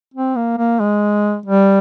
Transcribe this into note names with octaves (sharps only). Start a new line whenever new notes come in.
C4
A#3
A#3
G#3
G3